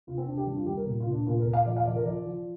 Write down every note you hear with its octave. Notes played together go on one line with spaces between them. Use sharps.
C3 F4
C4
C3 D4
G4
G3 D4
F4
G3 G4
A#4
A#2
F4
A#2
D4
A#2 F4
A#4
A#2
F5
F3 D5
F5
F3 D5
A#4
F3 D5
F3